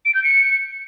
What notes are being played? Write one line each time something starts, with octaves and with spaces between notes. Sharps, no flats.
D7
G6
C#7